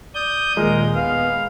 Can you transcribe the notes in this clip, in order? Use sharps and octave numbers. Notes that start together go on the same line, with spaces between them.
D5 D#6 G6
D#2 A#2 G#3 A#4
B3 F5